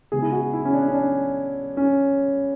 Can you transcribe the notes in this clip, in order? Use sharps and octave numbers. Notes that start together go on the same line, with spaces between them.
C#3 G#3 B3 G#4
E4
F#4
E4
C#4
D4
C#4
D4
C#4